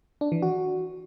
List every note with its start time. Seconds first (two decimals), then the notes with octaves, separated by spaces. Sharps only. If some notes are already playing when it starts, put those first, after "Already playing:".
0.21 D4
0.32 E3
0.42 F#4